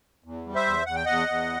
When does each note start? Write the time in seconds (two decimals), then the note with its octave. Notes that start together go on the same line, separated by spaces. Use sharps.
0.24 E2
0.46 G3
0.55 C5 E5
0.66 E2
0.86 E2 F#5
0.96 G5
1.06 E2 D#5 F#5
1.28 E2